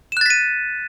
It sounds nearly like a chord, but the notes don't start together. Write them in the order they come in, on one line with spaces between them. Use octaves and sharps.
E7 F#6 A6 B6 D#7